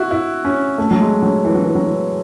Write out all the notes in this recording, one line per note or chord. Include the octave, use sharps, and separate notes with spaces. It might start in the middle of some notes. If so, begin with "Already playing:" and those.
Already playing: E4 F#4
E4
C#4
A3
F#3
G#3
F#3
E3
F#3
E3
F#3
E3